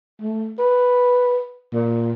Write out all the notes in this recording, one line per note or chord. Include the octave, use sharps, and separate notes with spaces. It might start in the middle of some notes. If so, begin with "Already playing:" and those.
A3
B4
A#2